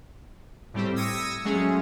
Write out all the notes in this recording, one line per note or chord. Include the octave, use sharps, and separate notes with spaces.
A2 G3 C4 G4
D#6 E6 G#6 A#6 C#7 D#7
F#3 G#3 A3 C#4 G#4